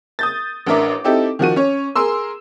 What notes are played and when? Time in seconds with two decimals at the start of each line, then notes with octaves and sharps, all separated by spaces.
0.19 D#6 G6 A6
0.67 A1 D4 A#4 E5 D6
1.04 C4 D#4 E4 G4 A4
1.39 D#3 F3 F#4 D#7
1.56 C#4 C#5
1.96 G#4 A#4 C6 E6